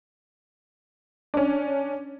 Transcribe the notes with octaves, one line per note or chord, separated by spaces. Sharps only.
C#4 D4